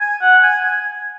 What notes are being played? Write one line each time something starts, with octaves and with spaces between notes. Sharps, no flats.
G#5
F#5
G#5
G#5